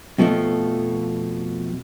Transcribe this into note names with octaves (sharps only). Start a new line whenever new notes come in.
F2 B2 F3 G3 A3